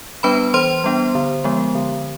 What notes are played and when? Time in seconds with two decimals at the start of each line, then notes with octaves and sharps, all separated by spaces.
0.23 G3 B3 D4 B4 B5
0.54 E3 C5 C6
0.84 G3 B3 D4
1.15 D3
1.44 F3 G#3 B3
1.75 D3